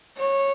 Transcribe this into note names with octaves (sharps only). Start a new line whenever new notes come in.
C#5